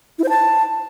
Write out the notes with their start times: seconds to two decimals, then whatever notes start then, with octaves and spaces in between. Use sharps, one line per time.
0.19 E4
0.24 C5
0.29 A5